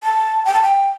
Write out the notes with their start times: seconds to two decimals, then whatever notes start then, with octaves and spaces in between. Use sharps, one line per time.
0.03 A5
0.45 G5
0.53 A5
0.62 G5